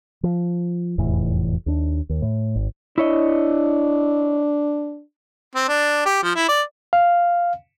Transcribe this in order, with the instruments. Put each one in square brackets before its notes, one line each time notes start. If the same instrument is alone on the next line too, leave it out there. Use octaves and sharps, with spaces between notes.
[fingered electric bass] F3
F1 E2 A2 E3
D#2 D4
D#2
A2
G#1
[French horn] D4 [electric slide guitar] E4 C#5 D#5
[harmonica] C4
D4
G4
F3
E4
D5
[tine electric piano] F5